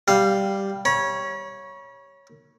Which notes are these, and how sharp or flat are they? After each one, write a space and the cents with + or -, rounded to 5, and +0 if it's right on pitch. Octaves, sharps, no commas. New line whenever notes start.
G3 +0 F5 +0
C#5 +0 B5 -45